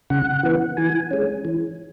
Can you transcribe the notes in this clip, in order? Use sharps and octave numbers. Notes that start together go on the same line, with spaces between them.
C#3 F#5
E3 B3
E3 G#5
G#3 C#4
E3